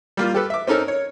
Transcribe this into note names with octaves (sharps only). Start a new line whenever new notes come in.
G3 A#3 F4
G4 A4 B4
E5 D6
C4 C#4 D#4 A4 A#4
C#5